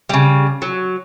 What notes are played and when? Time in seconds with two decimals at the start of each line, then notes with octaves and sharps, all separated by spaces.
0.09 C#3 G3
0.62 F#3